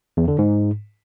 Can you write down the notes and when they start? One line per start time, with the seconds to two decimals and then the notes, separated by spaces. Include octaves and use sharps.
0.17 E2
0.28 D3
0.38 G#2